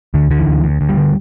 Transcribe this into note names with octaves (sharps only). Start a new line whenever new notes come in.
D2 D3
D3
E3
D2
D2
D2
G3
D3